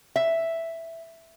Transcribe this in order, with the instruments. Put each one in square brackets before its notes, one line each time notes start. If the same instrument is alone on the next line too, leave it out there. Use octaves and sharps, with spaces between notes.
[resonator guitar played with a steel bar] E5